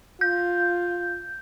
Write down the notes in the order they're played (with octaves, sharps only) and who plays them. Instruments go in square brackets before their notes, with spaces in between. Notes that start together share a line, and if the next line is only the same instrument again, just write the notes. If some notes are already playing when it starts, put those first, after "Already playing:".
[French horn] F4 [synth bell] G6